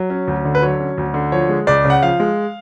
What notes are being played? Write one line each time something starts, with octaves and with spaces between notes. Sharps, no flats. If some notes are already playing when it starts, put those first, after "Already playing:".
Already playing: F#3
C#4
D2
D3
B4
F#3 C#5
C#4
D2
D3
F3 C#5
G#3
C#2 D5
C#3
F#5
F3 F5
G#3